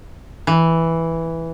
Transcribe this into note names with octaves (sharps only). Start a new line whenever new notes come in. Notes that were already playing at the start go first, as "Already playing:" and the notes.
E3